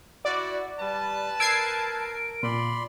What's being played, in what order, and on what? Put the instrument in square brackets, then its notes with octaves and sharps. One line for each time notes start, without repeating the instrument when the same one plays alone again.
[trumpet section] E4 F#4 [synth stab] D5
[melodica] G3 [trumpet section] B4 A5
[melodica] A#4 [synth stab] E6 G#6 C7 [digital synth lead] D7
[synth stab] A#2 [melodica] D5 B5 C6